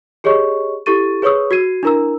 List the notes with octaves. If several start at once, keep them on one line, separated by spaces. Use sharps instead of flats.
G4 G#4 C#5 D#5 C#6
E4 G4 A4 C#6 A6 D#7
G#4 B4 C#5 C#6 D#6 E6
F#4 G#6 C7 D#7
D4 E4 A#4 A#5 E6